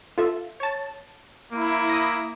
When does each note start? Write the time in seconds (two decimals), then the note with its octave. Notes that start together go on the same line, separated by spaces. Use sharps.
0.18 F4 A4 E5
0.60 C#5 A5
1.52 A#3 E4
1.89 D#6 A#6